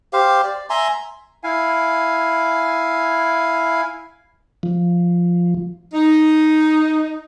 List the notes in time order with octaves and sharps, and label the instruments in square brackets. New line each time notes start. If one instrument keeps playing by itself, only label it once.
[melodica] G4 C5 F5
D5
E5 G#5 A#5 C6
[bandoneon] E4 F5 G#5
[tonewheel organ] F3
[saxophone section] D#4